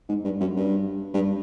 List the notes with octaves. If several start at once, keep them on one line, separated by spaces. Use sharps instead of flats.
G#2
G2
F#2
G2
G2